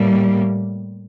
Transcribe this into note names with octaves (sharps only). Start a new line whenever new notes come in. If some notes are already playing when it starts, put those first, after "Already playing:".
Already playing: A2 G3 A#3